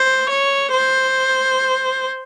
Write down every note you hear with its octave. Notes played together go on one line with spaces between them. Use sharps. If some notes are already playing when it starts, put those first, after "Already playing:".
Already playing: C5
C#5
C5